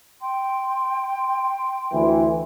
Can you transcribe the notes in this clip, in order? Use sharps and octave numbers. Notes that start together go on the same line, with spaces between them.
G5 C6
D2 E3